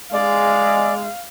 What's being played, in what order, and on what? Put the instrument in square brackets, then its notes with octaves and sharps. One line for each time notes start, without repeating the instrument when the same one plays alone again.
[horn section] G#3 [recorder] D5 [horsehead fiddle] F5